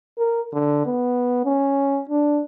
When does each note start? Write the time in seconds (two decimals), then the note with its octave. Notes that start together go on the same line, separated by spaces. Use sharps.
0.18 A#4
0.53 D3
0.86 B3
1.45 C#4
2.10 D4